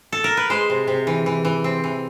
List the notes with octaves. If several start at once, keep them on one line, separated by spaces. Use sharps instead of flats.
A4
A#4
B4
G#3 C5
C3
C3
E3
E3
E3
C4
E3